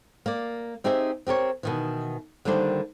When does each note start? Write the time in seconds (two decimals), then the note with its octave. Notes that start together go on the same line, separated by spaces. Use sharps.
0.26 A#3 D5
0.84 C4 D#4 G4 G#4 D#5 E5
1.27 C4 G4 A#4 C#5
1.63 B2 D#3 E3
2.45 D3 D#3 G3 A#3 D4 C5